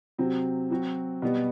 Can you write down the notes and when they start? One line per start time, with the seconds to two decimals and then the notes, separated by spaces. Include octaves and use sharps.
0.18 C3 F#3 C4
0.70 F#3 C4 F#4
1.22 B2 G3 B3